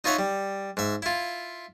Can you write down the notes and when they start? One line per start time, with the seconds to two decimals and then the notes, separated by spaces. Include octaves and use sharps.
0.04 D#4 F4 C#5 E5 F#5
0.19 G3
0.77 G#2 E5
1.02 E4 F4